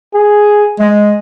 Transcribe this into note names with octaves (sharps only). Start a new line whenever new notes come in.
G#4
G#3 D#5